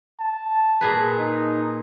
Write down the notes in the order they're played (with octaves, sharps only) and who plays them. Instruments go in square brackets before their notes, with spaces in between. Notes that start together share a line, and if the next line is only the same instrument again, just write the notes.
[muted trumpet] A5
[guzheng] A#2 G#4 B4
[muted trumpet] D#4